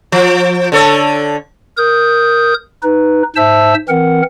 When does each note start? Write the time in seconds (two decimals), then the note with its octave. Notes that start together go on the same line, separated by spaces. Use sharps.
0.12 F3
0.72 D3 A4 C#5
1.77 A#4 D#6 G6
2.83 D#4 B4
3.36 G#2 C5 E5 A5 E6
3.89 E3 C4 A#4 F#5